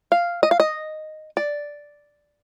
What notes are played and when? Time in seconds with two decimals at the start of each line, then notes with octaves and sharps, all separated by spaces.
0.12 F5
0.43 D#5
0.51 F5
0.60 D#5
1.37 D5